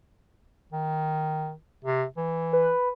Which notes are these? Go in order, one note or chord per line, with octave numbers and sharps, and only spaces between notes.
D#3
C3
E3
B4